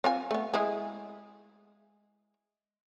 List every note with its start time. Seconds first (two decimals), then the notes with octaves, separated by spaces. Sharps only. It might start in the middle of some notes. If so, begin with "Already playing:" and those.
0.04 C4 F4 G#5
0.31 A3 B3
0.54 G#3 E4 G#4